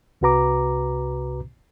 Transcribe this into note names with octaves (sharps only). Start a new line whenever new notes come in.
C2 C3 F#4 B4 A#5 D6